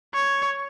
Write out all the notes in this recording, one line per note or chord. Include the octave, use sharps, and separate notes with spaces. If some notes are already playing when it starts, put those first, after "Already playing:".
C#5